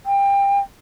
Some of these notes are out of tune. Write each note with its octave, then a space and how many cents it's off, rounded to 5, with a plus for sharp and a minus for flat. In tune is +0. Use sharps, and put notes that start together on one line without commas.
G5 +25